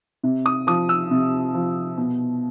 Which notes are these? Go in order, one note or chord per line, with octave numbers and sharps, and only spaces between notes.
C3
D#6
F3 D#6
E6
C3
F3
B2